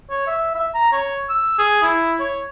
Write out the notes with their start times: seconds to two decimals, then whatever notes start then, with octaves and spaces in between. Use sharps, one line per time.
0.10 C#5
0.27 E5
0.55 E5
0.74 A#5
0.92 C#5
1.29 E6
1.59 G#4
1.83 E4
2.20 C#5